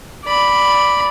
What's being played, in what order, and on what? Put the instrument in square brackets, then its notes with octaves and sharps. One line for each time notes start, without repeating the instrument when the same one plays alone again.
[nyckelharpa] D5 B5